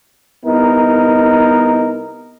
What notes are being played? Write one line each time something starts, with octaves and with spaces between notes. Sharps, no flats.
C2 B3 D#4 A#4